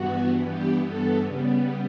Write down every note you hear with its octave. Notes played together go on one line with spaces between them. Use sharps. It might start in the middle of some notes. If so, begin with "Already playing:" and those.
Already playing: G2 E3 B3 F#4
G4
A4
C#3 G3 B3